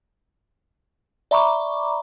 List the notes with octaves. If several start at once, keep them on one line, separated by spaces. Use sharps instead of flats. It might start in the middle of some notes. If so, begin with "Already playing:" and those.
D5 E5 A#5 B5 C#6 D6